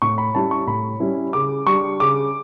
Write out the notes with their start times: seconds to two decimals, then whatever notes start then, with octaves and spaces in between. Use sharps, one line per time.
0.02 A2 C#6
0.18 B5
0.35 G3 C#4 E4 A5
0.51 C#6
0.67 A2 B5
1.00 G3 C#4 E4
1.33 C#3 D6
1.67 G3 D4 C#6
2.00 C#3 D6